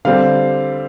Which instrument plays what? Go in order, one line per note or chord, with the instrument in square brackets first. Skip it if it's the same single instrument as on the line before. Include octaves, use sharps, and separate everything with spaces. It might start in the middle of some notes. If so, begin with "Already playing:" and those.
[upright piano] D3 G3 C4 F5